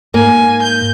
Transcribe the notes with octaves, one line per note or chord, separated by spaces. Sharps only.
G#2 A#3 G#5
G6